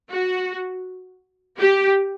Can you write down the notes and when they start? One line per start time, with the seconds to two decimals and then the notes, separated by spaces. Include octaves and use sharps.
0.10 F#4
1.59 G4